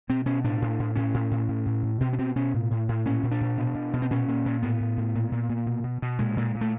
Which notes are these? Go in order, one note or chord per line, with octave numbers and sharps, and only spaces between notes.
B2 C4
B2 C#4
A2 D4
A2
A2
A2 C#4
A2
A2
A2
A2
A2
B2 C4
C#4
B2 C4
B2 C#4
A2
A2
A2
A#2 C#4
A#2
D4
A#2
B2
B2
B2
C4
A#2 C#4
A#2
A#2
A2 B3
A2
A2
A#2
A#2
A#2
B2
B2
B2
A#2 G#3
A#2
A#2
A3